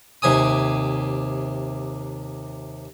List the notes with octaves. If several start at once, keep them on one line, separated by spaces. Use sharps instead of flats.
D#2 C3 G#5 D#6